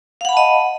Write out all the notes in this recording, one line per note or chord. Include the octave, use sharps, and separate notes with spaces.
D#5 F5 F#5 A5 B5